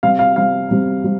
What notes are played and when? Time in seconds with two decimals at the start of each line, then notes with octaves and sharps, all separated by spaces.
0.03 C3 G3 C4 F5
0.19 F5
0.36 C3 G3 C4 F5
0.71 C3 G3 C4
1.04 G3 C4